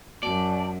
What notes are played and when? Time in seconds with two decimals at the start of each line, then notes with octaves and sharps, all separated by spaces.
0.23 F#2 F#4 D5 A5